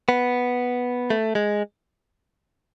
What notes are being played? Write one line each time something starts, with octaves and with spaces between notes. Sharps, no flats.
B3
A3
G#3